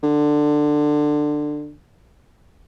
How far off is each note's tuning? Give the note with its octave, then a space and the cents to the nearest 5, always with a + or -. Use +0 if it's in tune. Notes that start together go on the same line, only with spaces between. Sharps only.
D3 +15